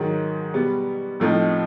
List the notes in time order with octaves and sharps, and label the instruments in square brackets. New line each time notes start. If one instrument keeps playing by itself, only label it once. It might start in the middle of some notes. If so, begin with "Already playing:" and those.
Already playing: [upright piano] G#2 D#3 F#3
B2 G3 B3
A2 F3 A3 C4 D#4